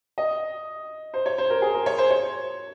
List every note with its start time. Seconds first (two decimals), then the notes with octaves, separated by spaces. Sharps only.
0.18 D#5
1.14 C5
1.26 C#5
1.38 C5
1.50 A#4
1.62 G#4
1.74 A#4
1.86 C#5
1.98 C5
2.10 C#5